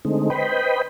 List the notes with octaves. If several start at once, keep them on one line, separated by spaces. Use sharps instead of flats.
D3 G#3 A3 C4 D#4
B4 C5 D#5 G5 B5